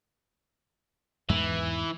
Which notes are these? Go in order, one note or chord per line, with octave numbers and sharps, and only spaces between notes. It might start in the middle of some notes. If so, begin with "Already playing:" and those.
E2 G#2 E3 G#3